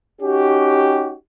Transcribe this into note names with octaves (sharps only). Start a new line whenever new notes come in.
C#4 D#4 F#4 G4